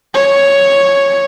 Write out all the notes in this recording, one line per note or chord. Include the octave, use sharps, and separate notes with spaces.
C#5